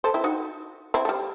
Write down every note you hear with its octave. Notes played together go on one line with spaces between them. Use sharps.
A4 C5
C4 E4
D#4 F#4
C4 E4
A3
G3